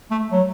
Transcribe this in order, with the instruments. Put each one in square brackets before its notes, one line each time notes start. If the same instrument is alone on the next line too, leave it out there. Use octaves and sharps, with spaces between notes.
[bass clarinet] A3
F#3